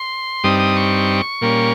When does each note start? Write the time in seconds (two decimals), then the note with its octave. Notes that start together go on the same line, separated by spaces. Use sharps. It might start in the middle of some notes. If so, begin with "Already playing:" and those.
Already playing: C6
0.44 G2 G3 C4 D#4 D#6
0.60 D#6
0.77 C#6
1.41 A#2 G3 A#3 C#4